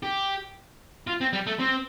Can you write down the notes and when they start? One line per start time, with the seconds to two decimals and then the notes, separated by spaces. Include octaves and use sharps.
0.03 G4
1.07 F4
1.21 C4
1.33 G3
1.46 A3
1.59 C4